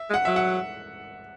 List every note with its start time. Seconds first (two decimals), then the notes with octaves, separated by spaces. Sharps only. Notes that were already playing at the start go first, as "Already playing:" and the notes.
Already playing: E5
0.10 G#3
0.14 F#5
0.25 F#3 E5
0.36 F#5